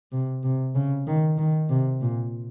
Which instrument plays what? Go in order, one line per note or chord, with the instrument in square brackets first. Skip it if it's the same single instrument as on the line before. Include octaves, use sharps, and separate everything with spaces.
[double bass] C3
C3
C#3
D#3
D#3
C3
A#2